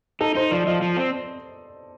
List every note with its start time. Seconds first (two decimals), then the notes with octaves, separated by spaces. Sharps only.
0.21 D#4 A4
0.35 D#4 C5
0.51 F3 D5
0.67 F3 D#5
0.82 F3
0.97 C4